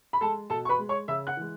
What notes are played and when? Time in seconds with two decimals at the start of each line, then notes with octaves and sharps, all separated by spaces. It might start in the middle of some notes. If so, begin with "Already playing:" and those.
0.13 B5
0.21 G#3 A4 A5
0.50 B2 A4 A5
0.65 C#6
0.69 B4 B5
0.79 G#3
0.89 C#5 C#6
1.08 C#3 E5 E6
1.27 F#5 F#6
1.37 E3 G#3